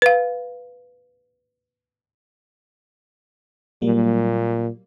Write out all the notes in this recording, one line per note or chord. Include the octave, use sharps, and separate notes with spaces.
B4 F5
A#2 F#3 G3 A#3